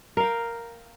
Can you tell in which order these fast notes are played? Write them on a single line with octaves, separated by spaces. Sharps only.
A#4 F5 G5